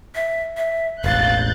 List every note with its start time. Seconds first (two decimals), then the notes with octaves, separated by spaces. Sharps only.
0.15 E5
0.57 E5
1.04 E1 A1 F5 F#6 G6 A6